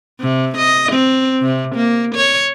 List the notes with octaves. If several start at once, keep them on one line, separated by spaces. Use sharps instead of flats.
C3
D#5
C4
C3
A#3
C#5